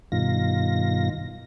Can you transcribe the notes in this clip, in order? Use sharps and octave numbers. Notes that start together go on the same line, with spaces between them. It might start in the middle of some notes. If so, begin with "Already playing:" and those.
G2 B2 D#3 F4 A#6